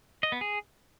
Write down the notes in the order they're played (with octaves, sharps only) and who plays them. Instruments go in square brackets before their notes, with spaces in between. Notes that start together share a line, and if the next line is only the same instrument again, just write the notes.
[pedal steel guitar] D#5
B3
G#4